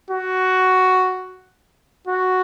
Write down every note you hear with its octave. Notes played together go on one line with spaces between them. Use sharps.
F#4
F#4